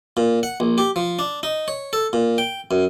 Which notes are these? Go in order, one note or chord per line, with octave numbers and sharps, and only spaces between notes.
A#2
F#5
A#1
G4
F3
D4
D#4
C#5
A4
A#2
G5
F#2